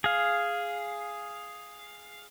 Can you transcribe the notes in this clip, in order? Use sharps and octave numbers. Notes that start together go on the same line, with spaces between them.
G#4 F5